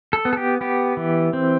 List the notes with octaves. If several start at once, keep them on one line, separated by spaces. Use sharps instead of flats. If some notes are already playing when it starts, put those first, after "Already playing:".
A4
B3
A4
G4
B3 G4
E3
C4